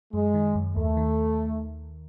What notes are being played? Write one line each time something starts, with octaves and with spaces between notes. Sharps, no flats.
F#2 G#3
D#3
F#2
D#2 A3
D#3